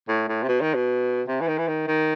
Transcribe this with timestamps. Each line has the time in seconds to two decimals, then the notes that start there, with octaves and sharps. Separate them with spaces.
0.08 A2
0.28 A2
0.43 C3
0.48 B2
0.61 D#3
0.75 B2
1.28 C3
1.41 E3
1.48 D#3
1.58 E3
1.68 D#3
1.88 D#3